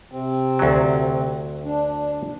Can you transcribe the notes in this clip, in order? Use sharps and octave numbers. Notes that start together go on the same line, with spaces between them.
C3 C4
D2 F#3
D4